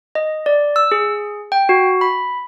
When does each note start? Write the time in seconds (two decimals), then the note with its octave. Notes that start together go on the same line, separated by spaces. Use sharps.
0.15 D#5
0.46 D5
0.76 E6
0.92 G#4
1.52 G5
1.69 F#4
2.01 B5